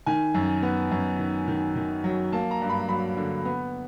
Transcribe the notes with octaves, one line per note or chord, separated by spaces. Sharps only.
D#3 G#5
F#2
B3
F#2
D#3
D#3
D#3
F#3
A#3 A5
A#5
G2
B5
F#3 B5
D3
B3